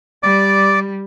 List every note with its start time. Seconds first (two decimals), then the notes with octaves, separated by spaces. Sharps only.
0.23 G3 D5 D6